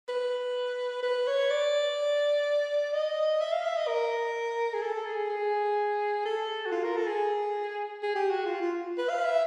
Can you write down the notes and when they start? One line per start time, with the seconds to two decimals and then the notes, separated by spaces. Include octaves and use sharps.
0.09 B4
1.03 B4
1.27 C#5
1.51 D5
2.94 D#5
3.41 E5
3.53 F5
3.64 E5
3.77 D#5
3.87 A#4
4.74 G#4
4.82 A4
5.06 G#4
5.30 G#4
6.25 A4
6.66 F#4
6.72 F4
6.84 A#4
6.96 A4
7.07 G#4
8.03 G#4
8.15 G4
8.30 F#4
8.46 F4
8.61 F4
8.98 B4
9.10 F5
9.25 E5